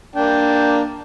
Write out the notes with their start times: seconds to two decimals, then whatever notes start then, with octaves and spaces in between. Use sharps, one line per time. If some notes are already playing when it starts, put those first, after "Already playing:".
0.16 A#3 D4 G5